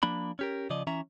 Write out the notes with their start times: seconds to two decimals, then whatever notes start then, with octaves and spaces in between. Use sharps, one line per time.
0.03 F3 A#3 D4 B5
0.39 C#4 G4 A#4
0.70 C#3 F3 D5 D#5
0.87 E3 C#4 E5 A#5